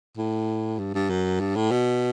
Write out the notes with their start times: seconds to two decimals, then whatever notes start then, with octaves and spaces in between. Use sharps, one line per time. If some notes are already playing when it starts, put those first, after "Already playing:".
0.18 A2
0.79 G2
0.95 G2
1.10 F#2
1.40 G2
1.56 A2
1.71 B2